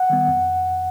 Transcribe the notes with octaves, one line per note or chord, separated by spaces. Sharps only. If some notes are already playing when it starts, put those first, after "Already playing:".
Already playing: F#5
D#3 G3 B3
F2